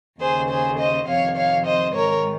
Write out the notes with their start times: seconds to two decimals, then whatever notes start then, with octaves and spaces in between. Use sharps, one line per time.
0.20 D#2 C#3 G#4 C5
0.49 G#4 C5
0.78 C5 D#5
1.07 F2 C3 D#3 C#5 F5
1.36 C#5 F5
1.66 C5 D#5
1.94 G#2 D#3 A#4 C#5